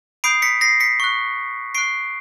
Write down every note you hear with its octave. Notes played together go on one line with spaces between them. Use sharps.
B5 D#6 G6 C7 D7
B6 C#7
A#6 C7
B6 C#7
C#6 F#6
C#6 F#6 C7 D7